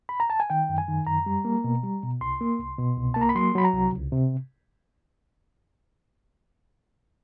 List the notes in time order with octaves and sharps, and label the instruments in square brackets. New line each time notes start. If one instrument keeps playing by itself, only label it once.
[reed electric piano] B5
A#5
A5
G#5
D#3 G5
F#2
G#5
D#3
F#2 A#5
G3
A#3
B2
G3
B2
C2 C6
A#3
C2
B2
C2
A#3 A5
A#5
B5
F#3 C6
F#3 B5
A#5
C2
C#2
C3